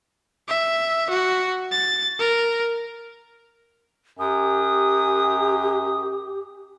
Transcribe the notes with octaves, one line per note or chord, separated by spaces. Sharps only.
E5
F#4
A6
A#4
F#2 G4 D#6